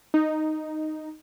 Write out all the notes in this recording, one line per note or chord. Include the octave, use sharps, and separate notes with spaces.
D#4